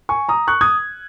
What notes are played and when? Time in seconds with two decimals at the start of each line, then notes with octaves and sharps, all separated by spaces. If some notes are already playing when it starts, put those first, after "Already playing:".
0.09 G#5 C#6
0.29 A#5 D#6
0.48 C#6 F#6
0.61 D#6 G#6